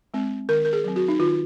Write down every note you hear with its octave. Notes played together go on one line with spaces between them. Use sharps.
G#3 C4
D#3 A#4
A#4
G#4
F#3 C4
F#4
D#4
D#3 F4